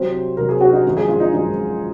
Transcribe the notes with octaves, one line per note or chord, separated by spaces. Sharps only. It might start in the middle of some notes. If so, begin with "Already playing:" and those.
Already playing: C2 C3 F#3 C5
C2 C3 F#3 A#4
G#4
F#4
D#4
G#1 F#2 F3 G#3
G#4
F4
D#4
G#1 F#2 F3 G#3 D#4